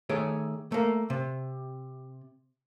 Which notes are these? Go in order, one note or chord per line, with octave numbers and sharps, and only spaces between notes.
D#3 A3 G#4 C#5 D5
A3 A#3
C3